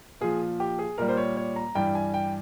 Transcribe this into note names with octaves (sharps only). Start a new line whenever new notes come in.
A#2 F3 G#4
G4
G#4
A#2 G3 A#4
C5
C#5
C#5
A#5
G2 E3 G3 G5
G#5
G5